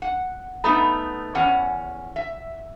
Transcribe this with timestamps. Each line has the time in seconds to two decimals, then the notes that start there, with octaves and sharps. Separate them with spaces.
0.02 F#5
0.64 A3 B3 D#4 A#5 B5 D#6
1.35 E2 C#4 F#5
2.16 E5